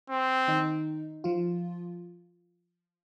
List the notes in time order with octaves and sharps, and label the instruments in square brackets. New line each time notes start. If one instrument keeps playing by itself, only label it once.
[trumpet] C4
[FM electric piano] D#3 D#4
F3 F4